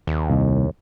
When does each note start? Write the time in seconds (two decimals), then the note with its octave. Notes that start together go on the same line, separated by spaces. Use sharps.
0.07 D#2
0.30 C2